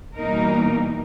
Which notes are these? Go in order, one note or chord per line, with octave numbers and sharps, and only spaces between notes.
B2 E3 G3 A#3 D#4 A#4